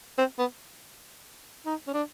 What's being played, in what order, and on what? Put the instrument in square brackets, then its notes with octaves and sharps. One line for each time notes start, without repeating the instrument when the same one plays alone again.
[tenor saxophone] C4
B3
D#4
C#4
D4